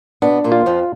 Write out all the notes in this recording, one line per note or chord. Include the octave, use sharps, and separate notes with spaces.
B2 B3 D4
A#2 A#3
F4
F2 F3